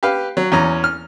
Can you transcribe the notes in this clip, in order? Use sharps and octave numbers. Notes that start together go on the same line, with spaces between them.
G4 B4 F5
F#3
E2 C#4 A#5
F6